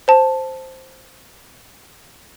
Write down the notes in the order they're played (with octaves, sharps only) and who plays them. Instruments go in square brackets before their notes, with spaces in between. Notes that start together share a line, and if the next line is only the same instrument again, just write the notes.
[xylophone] C5 A5